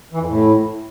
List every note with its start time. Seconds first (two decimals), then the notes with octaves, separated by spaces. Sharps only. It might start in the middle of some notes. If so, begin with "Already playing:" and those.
0.13 E3
0.20 F2
0.28 A2